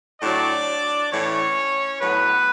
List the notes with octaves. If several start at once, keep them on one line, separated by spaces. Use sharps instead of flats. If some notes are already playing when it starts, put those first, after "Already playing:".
A2 F#3 D4 D5
A2 E3 C#4 C#5
A2 F#3 B3 B4